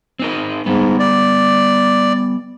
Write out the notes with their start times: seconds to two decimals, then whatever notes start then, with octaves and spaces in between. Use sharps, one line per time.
0.19 C4 D#4 A#4
0.66 G#2 G3 B3
1.00 D5